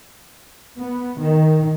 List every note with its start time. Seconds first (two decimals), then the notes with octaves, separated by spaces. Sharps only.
0.78 B3
1.19 D#3